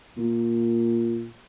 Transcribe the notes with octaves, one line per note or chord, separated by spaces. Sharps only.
A#2